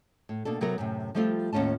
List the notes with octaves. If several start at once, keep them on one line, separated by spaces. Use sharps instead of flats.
A2
B2 A#3 D4 A4
C3 F#3 B3 A4 A#4
F#2 A2 C3
F3 G3 A3 C4 D#4 F4
D#2 A2 C#4 F4 A5